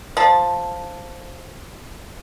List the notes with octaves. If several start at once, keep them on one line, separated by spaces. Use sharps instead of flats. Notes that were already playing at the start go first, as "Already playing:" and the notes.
F3 A5